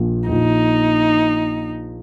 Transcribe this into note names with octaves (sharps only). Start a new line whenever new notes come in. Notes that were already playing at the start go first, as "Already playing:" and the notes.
Already playing: A#1 A#2 F3
A#1 A#2 F3 D#4